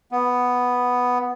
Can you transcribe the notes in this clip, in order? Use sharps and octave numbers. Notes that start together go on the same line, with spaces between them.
B3